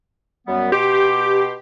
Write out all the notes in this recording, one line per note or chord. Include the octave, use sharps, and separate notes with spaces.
F#2 G3 B3
B2 G4 C6 D6